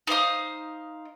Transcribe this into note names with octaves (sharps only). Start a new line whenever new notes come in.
D#4 C5 F5 D#6